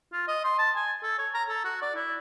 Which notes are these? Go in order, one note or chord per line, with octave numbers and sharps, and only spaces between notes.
F4
D#5
C6
A5
G#5
A4
C#5
A#5
A4
F#4
D5
E4